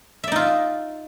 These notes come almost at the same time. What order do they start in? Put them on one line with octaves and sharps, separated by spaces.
E5 D5 D#4 F4